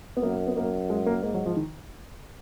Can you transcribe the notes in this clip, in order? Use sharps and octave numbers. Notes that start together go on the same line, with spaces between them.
B3
F#2 A#3
B3
F#2 A#3
G#3
A#3
G#2 A#3
F#3
F3
D#3